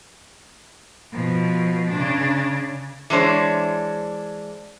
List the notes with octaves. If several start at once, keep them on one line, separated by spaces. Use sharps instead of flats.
B2 F3
C#3 D4
E3 G#3 D4 C5 C#5